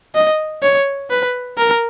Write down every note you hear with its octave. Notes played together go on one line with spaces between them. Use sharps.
D#5
C#5
B4
A#4